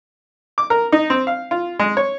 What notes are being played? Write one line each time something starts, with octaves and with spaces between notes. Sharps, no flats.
D6
A#4
D#4
C4
F5
F4
G#3
C#5